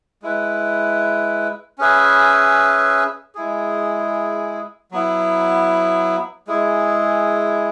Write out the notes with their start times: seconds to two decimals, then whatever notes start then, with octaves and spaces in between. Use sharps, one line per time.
0.22 G#3 E4 B4
1.78 C#4 G#4 B4 E5
3.35 G#3 E4 G#4
4.91 F#3 B3 E4
6.47 G#3 E4 G#4